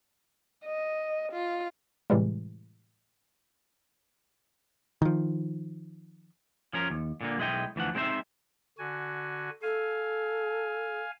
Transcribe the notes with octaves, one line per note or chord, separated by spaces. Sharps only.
D#5
F4
A2 C3 E3 G3 G#3
D#3 F3
F3 C#4 A#4
D#2
A#2 D3 A#3
B1 G#3 E4 D#5 G5
D2 E3 F3 F#5
G#3 C4 D#4 F#4 C5 E5
D3 F#4 G#5
A4 F5 G#5